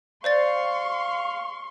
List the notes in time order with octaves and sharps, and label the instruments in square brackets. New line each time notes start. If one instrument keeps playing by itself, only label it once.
[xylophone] C5 D5 A6 [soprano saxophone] F5 [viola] C6 C#6